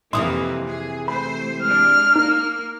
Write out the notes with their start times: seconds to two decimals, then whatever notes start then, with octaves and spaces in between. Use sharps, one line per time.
0.13 F2 C3 E3 A#3 D#4 E4 C6 D#6
0.67 G#4
1.08 A3 C5 B5
1.62 G#3 D4 F6
2.16 A#3 D#4